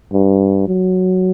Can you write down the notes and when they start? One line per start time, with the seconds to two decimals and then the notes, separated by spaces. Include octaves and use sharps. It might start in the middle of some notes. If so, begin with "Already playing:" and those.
0.13 G2
0.68 F#3